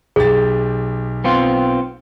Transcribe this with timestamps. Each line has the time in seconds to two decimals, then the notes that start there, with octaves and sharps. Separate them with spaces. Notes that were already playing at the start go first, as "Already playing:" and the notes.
0.16 B1 G4 G#4 A6
1.24 B3 C4 F4